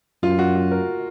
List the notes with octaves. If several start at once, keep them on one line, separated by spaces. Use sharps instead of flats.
F#2 F4
F#4
F#4
A#4